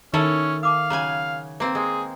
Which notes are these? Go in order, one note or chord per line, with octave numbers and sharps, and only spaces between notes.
D#3 C#4 D#4 E4 A4 C#5 A5
F5 A5 D6 D#6
C#3 F#3 G#5 A#5
A#3 C4 B4
G#3 G#4